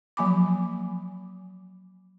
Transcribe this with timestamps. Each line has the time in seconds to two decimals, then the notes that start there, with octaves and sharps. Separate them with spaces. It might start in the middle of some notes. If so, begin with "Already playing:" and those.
0.17 F3 F#3 A#3 G#5 B5 D6